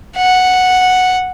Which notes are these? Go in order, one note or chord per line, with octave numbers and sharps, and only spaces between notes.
F#5